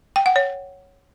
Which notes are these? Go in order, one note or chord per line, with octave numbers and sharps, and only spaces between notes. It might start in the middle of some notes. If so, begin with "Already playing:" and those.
G5
F#5
C#5